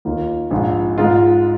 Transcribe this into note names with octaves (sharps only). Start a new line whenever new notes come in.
D#2 D#3 A#3 F4
A#1 G#2 F3
G#2 G#3 F4